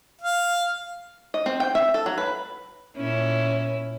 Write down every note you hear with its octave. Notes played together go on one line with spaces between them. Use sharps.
F5
D#5
C4
G5
E5
A4
F#3
B4
A#2 C#4 E4 C#5